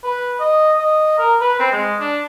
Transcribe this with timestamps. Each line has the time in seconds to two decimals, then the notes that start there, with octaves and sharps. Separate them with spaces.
0.04 B4
0.40 D#5
0.79 D#5
1.18 A#4
1.41 B4
1.60 C4
1.72 G#3
2.00 D4